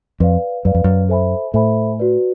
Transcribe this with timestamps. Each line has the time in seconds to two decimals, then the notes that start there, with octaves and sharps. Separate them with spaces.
0.20 F2 B4 D5 F5
0.65 F#2 B4 D5 F5
0.74 F2
0.84 F#2
1.09 A4 C5 E5 G#5 B5
1.53 A2 A4 C5 E5 G#5 B5
1.99 F#4 B4 D5